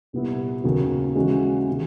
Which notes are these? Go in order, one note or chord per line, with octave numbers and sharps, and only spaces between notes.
C2 A#2 G3 B3 E4
D#2 C#3 F#3
C#3 E3 G#3 C#4 F#4
C3 D#3